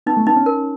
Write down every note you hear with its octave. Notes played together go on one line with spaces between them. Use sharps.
B3 D#4
A3
B3 D#4
C#4
A#4